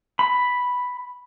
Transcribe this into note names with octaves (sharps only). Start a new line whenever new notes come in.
B5